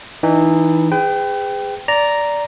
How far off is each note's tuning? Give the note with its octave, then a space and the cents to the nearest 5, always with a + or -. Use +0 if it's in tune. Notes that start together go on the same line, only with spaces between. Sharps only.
E3 -15 D#4 -35
G#4 -25 B4 +40 G5 +0
D5 -10 A#5 +0